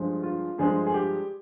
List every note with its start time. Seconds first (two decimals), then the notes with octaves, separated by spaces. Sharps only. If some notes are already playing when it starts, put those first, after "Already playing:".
Already playing: G2 F3 G#3
0.23 F4
0.58 G2 F3 G#3 G#4
0.86 G#4
0.94 G4